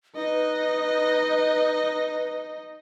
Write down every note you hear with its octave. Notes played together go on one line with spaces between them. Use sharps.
D#4 B4 D#5